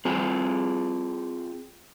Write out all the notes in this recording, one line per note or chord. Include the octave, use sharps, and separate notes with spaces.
C4 F4 G#4 G#5